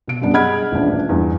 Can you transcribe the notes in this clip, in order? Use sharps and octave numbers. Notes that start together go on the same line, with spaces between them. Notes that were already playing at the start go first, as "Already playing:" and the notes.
B2 D7
F#2 G3 B3 D4
G#4 D#5 F#5 B5 F6 G#6
D#1 A1 D4
E2 G2